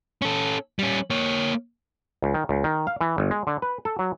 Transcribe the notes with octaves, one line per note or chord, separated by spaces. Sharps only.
C#4 A4
G3 C#4
A#3 C#5
C#2
D#3
C#2
D#3
F5
E3
G1
G#3
D3
B4
A4
F#3